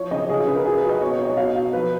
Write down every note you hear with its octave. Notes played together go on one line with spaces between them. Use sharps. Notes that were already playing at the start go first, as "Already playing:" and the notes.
Already playing: F3 C#5
C#3 D#5
C#3 G#4
F4
C#3 B4
A#4
F#3 G#4
B4
F#3
D#5
B2 C#5
C#5
F#3
D#5
B2 F5
F#3 F5
F3 B4